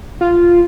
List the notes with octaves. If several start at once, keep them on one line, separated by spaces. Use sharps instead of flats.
F4